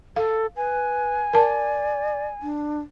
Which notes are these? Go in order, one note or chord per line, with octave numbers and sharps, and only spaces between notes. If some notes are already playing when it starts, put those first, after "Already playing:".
A4 F5
B4 G#5
A#4 D5 A5
D4